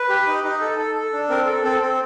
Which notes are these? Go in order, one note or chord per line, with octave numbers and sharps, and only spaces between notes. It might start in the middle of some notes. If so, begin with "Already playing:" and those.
Already playing: B4
G4
D#4
D#4
A4
A4
A4
D4
C4 A#4
A4
C4 A4
C4